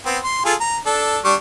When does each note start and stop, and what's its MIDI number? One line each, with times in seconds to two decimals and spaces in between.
0.06 0.18 59
0.06 0.18 60
0.24 0.44 84
0.45 0.55 65
0.45 0.55 68
0.45 0.55 69
0.60 0.77 82
0.86 1.19 62
0.86 1.19 69
1.25 1.35 55
1.25 1.35 62
1.25 1.35 85